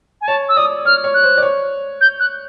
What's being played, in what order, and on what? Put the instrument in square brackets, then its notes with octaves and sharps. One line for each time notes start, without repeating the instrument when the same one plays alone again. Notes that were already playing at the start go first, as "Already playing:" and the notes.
[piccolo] G#5
[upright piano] C#5 [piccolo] A5
[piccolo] E6
[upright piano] D5 [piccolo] D#6
[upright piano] C#5 [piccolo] F6
[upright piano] C#5
[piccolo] F#6
[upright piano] C5
D5
C#5
[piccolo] G6
F#6